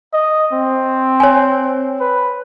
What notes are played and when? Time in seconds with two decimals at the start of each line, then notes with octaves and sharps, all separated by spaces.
0.14 D#5
0.52 C4
1.20 C#5 G#5
2.00 B4